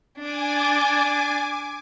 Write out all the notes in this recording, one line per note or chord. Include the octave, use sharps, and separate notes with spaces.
D4 G#5 D6